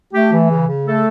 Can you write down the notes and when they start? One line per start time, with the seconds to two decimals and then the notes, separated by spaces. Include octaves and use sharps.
0.14 A3 G4
0.33 E3
0.51 C#3
0.68 C#3
0.86 A3 A4